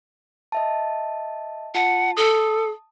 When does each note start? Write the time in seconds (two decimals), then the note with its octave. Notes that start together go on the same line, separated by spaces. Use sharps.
0.52 D#5 E5 A5
1.75 F4 F#5 A5
2.17 A4 A5 D#6